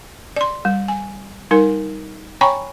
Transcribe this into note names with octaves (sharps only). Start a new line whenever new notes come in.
D5 C6
G3
G#5
G3 D#4 A#4 G#5
C#5 G5 G#5 A#5 B5 C#6